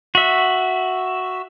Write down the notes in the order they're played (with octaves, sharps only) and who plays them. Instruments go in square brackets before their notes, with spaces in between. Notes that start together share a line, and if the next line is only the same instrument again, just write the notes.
[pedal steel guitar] F#4 E5